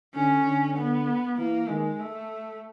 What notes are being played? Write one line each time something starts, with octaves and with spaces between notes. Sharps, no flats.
D3 C#4
D3
B3
E3 A#3
D#3 G#3
A3